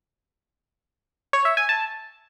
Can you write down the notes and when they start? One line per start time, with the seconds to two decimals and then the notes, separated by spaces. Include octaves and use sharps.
1.33 C#5
1.45 E5
1.57 G#5
1.69 A5